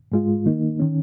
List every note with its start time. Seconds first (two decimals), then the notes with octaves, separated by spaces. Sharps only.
0.12 G#2 G#3 F4
0.46 D#3 A#3 D#4
0.80 D#3 C#4